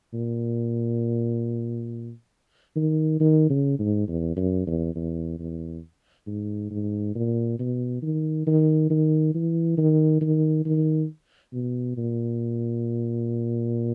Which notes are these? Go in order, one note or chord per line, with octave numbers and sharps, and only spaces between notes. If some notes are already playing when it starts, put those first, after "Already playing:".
A#2
D#3
D#3
C#3
G#2
E2
F#2
E2
E2
E2
G#2
G#2
A#2
B2
D#3
D#3
D#3
E3
D#3
D#3
D#3
B2
A#2